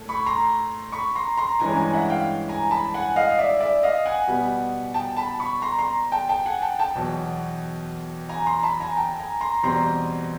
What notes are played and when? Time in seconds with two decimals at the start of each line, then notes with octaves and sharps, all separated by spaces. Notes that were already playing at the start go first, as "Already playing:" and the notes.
Already playing: A2 A3
0.09 B5 C#6
0.26 A#5 C6
0.92 B5 C#6
1.15 A#5 C6
1.37 A#5 C6
1.59 G2 E3 G#3 C#4 G#5 A#5
1.76 G#5 A#5
1.93 E5 F#5
2.10 F5 G5
2.49 G#5 A#5
2.71 A5 B5
2.94 F#5 G#5
3.16 D#5 F5
3.39 D5 E5
3.60 D5 E5
3.83 D#5 F5
4.06 F#5 G#5
4.27 B2 G3 B3
4.94 G5 A5
5.17 A5 B5
5.39 B5 C#6
5.62 A#5 C6
5.78 A#5 C6
6.12 G5 A5
6.29 G5 A5
6.46 F#5 G#5
6.62 G5 A5
6.79 G5 A5
6.95 E2 B2 F#3
8.29 G#5 A#5
8.47 A#5 C6
8.63 A5 B5
8.80 G#5 A#5
8.97 G5 A5
9.19 G#5 A#5
9.41 A#5 C6
9.63 E2 B2 G3 C4 A#5 C6